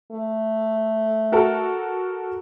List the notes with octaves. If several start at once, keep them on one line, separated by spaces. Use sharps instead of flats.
A3
F#4 A4 A#4